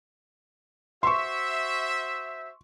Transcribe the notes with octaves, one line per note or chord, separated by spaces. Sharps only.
F#4 C5 E5 C6 C#6